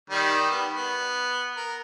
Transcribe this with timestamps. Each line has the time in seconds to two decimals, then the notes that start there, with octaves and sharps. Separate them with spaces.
0.10 D#3 G3
0.50 B3
0.75 B3
1.57 A#4